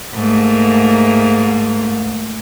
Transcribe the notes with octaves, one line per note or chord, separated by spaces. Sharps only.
G#2 A3 A#3